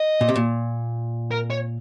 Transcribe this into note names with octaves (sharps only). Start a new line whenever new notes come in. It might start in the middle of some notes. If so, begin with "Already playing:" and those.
Already playing: D#5
A#2
C3
A#2
A#4
C#5